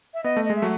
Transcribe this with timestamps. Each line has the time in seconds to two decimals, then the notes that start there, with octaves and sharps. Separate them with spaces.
0.14 E5
0.24 B3 D#5
0.37 A3
0.45 G#3 D#5
0.56 E5
0.62 F#3 A3